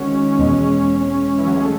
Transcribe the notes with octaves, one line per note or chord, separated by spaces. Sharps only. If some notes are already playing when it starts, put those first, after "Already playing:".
Already playing: D#3 G#3 C#4 F#4
E2 B2 G#3
C#4
E3
F#3
G#3
A3